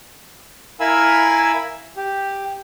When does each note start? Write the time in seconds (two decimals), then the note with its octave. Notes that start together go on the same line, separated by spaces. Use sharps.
0.80 E4 A#4 F5 G#5 B5 E6
1.97 G4